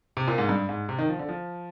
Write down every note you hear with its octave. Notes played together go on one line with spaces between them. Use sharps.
C3
A#2
G#2
G2
G#2
C3
D#3
F3
D3
F3